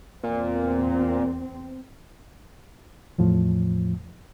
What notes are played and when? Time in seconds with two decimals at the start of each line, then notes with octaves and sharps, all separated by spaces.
0.23 E2 A#2 C4
3.18 E2 A2 F3